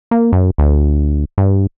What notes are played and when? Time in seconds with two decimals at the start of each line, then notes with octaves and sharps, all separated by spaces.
0.11 A#3
0.32 F#2
0.58 D2
1.38 G2